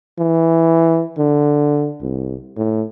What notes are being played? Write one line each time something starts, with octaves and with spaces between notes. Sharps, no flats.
E3
D3
C2
A2